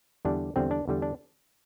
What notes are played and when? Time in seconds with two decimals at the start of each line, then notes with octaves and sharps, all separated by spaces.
0.25 E2 D3 G3 D4
0.56 E2 D3 G3 C4
0.71 D4
0.88 E2 D3 G3
1.02 D4